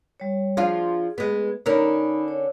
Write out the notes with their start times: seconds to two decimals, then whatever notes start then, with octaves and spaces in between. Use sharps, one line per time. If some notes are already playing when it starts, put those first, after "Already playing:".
0.20 G3 C#5
0.57 F3 D4 F4 G#4
1.18 G#3 B3
1.66 D3 C#4 D#4 A#4 B5
2.28 C#5